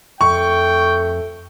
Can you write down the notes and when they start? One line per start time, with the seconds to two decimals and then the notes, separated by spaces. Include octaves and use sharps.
0.21 F2 A3 G5 C#6